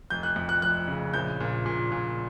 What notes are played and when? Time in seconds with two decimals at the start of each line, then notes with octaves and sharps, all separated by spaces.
0.10 F1 G6
0.23 F#6
0.36 F2
0.49 F#6
0.62 F1 F#6
0.88 C#3
1.14 A#1 G6
1.40 A#2
1.66 A#2
1.92 A#2